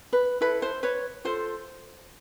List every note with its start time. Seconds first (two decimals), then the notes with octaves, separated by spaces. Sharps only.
0.13 B4
0.41 E4 A4 B4
0.62 C5
0.83 B4 C#5
1.25 F4 A4 C5